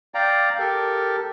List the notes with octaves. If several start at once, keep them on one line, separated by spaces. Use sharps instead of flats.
D5 F5 G5 A#5
G4 A4 A#4